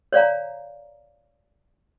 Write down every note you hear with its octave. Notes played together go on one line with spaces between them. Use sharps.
C#5 D5 F5 A#5